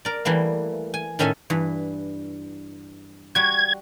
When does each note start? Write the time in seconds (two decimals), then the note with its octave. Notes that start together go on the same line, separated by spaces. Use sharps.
0.05 A#4 D5
0.25 E3 G3 A3 A#3
0.94 G#5
1.19 A2 D#3 C#4 A4 E5 G#5
1.50 G2 E3
3.35 G3 F#4 G#6